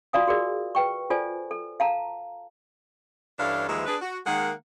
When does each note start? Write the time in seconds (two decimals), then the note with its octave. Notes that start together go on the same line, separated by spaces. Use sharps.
0.13 F4 F#4 D5 F5 G#5 D#6
0.27 F#4 G#4 A#4 D5
0.75 B4 G5 C#6
1.10 F4 A4 C5 D5 G#5
1.51 A4
1.80 F5 A5 A#5
3.38 G2 E3 C#4 D4 A4 F5
3.68 D#2 E3 F3 G#3 B4 E5
3.87 D4 G#4 B4
4.01 F#4
4.26 D#3 G#3 A#3 G#4 F#5